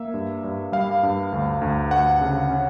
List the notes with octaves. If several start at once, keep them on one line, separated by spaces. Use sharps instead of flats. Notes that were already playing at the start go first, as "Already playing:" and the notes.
Already playing: A#3 E5
G2
G2
G3 F5
G2
D2
D2
D2 F#5
C#3
C#4